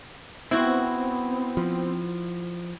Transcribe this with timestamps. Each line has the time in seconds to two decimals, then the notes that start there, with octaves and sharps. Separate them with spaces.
0.51 B3 C4 E4 F#4
1.57 F3